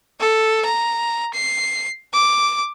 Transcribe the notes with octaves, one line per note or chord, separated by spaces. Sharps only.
A4
A#5
C7
D6